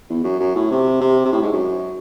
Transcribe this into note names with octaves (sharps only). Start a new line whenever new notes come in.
E2
F#2
F#2
A2
C3
C3
C3
A2
G#2
F#2